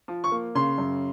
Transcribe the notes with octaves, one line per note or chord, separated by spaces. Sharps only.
F3
C#6
A#3
C#3 C6
F#2